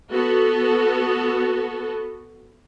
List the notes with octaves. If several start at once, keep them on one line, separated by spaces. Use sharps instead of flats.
B3 F#4 A4